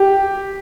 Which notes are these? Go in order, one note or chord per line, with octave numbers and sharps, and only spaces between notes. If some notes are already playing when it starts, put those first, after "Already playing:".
Already playing: G4